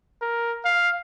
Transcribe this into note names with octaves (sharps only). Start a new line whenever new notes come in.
A#4
F5